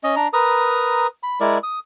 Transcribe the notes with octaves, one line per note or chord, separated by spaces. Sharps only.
C#4 D#5
D4 A#5
A#4 B4 A#5 D#6
B5
G#3 E4 A#4 D5
D#6